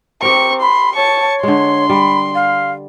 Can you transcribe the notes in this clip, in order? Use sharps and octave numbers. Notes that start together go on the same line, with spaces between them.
C4 G4 A#4 C#6
B5 C6
C#5 A5 C#6
D3 G#3 C6
G3 B5
F5